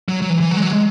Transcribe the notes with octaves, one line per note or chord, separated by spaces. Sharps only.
F#3
F#3
E3
E3
F#3
G#3
F#3
G#3